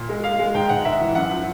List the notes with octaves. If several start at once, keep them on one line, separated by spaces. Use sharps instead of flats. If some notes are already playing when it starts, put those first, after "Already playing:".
Already playing: A#2
G#3
G#3 F5
G#3
G#2 G5
G#2 F#5
G#2 E5
E3
F#2 F#5
F3